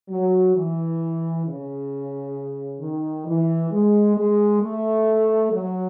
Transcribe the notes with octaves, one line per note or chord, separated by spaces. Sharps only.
F#3
E3
C#3
D#3
E3
G#3
G#3
A3
F#3